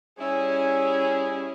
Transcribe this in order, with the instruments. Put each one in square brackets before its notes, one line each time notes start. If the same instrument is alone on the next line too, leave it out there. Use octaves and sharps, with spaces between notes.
[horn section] G3 E4 G#4 [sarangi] C#4